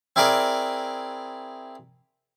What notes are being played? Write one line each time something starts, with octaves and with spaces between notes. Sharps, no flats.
C4 E4 G#4 A#4 D5 D#5